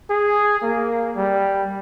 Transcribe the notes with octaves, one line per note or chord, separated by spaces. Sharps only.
G#4
A#3
G3